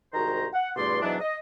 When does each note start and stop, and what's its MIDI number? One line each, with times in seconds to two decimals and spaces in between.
0.13 0.45 36
0.13 0.45 44
0.13 0.45 51
0.13 0.45 66
0.13 0.45 72
0.13 0.45 82
0.53 0.70 78
0.76 1.00 40
0.76 1.00 43
0.76 1.00 47
0.76 1.00 57
0.76 1.00 74
0.76 1.00 84
1.02 1.16 44
1.02 1.16 47
1.02 1.16 52
1.02 1.16 54
1.02 1.16 59
1.02 1.16 62
1.20 1.37 75